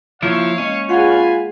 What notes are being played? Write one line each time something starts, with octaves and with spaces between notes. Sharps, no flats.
F3 A#3 E4 C#5 F5
G#3 C#4 D#5
F4 G#4 B4 F#5 G#5